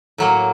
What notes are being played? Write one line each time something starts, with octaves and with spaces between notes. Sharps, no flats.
A2 F#3 A#3